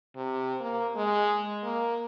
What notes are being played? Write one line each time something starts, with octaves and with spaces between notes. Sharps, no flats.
C3
A#3
G#3
A#3